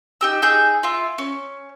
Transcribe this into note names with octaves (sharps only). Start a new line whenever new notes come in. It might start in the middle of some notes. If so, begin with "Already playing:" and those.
D#4 G4 E6
D#4 G#4 E6 G6
E4 F4
C#4